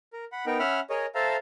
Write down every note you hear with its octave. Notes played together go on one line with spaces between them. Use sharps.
A#4
F#5 B5
B3 D#4 A#4 G5
C#4 E5 F#5 B5 F6
G#4 A#4 C#5 D#5
A4 C5 E5 F5 A5 A#5